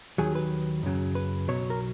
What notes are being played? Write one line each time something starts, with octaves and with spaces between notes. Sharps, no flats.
D#2 D#3 F#3 G#4
B4
F#2 C#3 F#3
B4
B1 B2 F#3 C#5
A#4